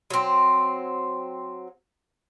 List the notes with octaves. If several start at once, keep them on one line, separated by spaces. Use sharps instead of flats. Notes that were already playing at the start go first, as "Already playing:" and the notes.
F#3 C4